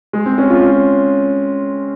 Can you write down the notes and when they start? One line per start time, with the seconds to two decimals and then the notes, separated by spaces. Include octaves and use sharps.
0.13 G#3
0.26 C4
0.38 C#4
0.50 F4